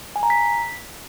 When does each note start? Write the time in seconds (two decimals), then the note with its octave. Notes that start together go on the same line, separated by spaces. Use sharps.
0.16 G#5
0.23 A#5
0.30 B6